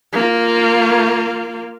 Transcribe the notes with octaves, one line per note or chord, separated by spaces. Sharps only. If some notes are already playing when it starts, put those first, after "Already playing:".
A#3 F4